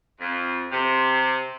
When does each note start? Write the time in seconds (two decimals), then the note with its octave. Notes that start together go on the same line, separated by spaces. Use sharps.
0.21 F2
0.72 C3